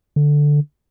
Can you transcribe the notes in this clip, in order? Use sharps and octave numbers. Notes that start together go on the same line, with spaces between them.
D3